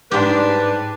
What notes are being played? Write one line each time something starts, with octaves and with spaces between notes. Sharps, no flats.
G#2 G3 D4 G4 B4